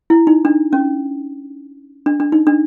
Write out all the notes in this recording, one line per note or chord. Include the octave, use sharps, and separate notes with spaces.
E4
D#4
D4
C#4
D4
D4
D#4
D4